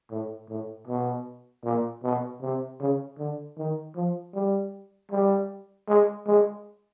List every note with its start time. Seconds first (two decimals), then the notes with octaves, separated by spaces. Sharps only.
0.11 A2
0.49 A2
0.87 B2
1.64 A#2
2.03 B2
2.41 C3
2.80 C#3
3.19 D3
3.57 D#3
3.96 F3
4.34 G3
5.11 G3
5.88 G#3
6.27 G#3